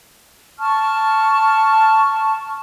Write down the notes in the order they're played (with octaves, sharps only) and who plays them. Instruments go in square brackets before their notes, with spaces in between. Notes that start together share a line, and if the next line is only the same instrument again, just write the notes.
[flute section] A5 C#6 F6